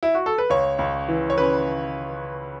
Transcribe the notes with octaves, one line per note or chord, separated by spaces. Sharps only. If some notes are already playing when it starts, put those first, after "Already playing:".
E4
F#4
A4
B4
C#2 C#5
C#2
E3
C#5
C#3 B4